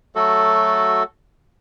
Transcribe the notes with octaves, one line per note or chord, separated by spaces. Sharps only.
F#3 A3 F#4 A4